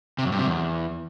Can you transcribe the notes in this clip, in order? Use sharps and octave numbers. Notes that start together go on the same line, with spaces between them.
C3
F#2
G2
C3
E2